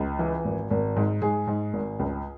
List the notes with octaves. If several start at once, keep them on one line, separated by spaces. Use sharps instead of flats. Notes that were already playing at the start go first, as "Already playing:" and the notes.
Already playing: C#2
E3
G#1
G#1
G#2
G#2 G#4
G#2
G#1
C#2